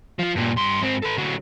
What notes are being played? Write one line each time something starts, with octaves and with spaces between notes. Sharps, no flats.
F3 F4
G2 A#2
G2 C6
G#2 C4
A4 B4
D3 F#3